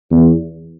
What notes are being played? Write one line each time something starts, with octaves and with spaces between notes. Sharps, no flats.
E2